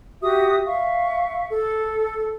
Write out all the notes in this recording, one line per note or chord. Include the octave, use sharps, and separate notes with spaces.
F#4 G4 E5 D#6
E5 F5 C#6
A4